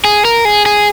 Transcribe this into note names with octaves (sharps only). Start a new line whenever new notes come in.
G#4
A#4
G#4
G#4